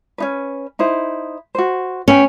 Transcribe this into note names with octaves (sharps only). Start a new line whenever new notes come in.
C#4 D#4 B4
D#4 E4 C5
F#4 C5
C#4 B4 G5